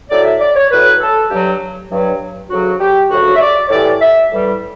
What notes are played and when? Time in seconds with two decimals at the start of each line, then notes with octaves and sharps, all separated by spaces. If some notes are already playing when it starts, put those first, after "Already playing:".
0.10 A2 F#3 D5
0.25 E5
0.40 D5
0.55 C#5
0.71 A2 F#3 B4
1.00 A4
1.30 G2 F#3 G4
1.90 G2 F#3
2.50 D2 C#3 F#3 F#4
2.80 G4
3.10 D2 C#3 F#3 F#4
3.36 E5
3.41 D5
3.67 C#5
3.70 A2 E3 G3 D5
4.01 E5
4.31 A2 E3 G3